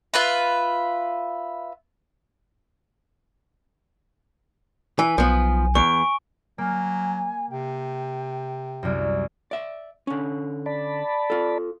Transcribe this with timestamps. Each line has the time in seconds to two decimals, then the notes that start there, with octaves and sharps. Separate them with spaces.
0.14 F4 B4 E5
4.99 E3 G#5
5.18 B1 F3 B3
5.75 E2 C#6 D7
6.58 F#3 A#3 G#5
7.51 C3 G5
8.83 C2 F#2
9.51 D5 E5
10.07 D3 C#4
10.66 D5 A5 B5
11.30 F4 A4